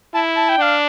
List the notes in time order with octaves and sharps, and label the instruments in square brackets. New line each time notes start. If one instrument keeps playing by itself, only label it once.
[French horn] E4 [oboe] A5
[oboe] A5
G5
[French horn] D4 [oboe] F5